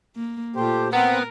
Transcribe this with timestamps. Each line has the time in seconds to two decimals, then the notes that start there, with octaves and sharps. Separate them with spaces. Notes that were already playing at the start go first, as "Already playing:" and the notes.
0.16 A#3
0.55 A#2 A3 F4 G4 C5
0.93 B3 C4 A#4 F#5 A#5